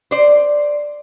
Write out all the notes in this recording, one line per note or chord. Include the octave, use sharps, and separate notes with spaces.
C5 D5